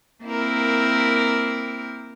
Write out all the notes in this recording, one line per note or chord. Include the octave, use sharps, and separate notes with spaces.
A#3 C4 E4 A#4